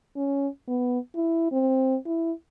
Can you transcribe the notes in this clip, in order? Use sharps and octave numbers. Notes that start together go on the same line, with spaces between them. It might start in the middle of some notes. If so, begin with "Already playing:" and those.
C#4
B3
E4
C4
E4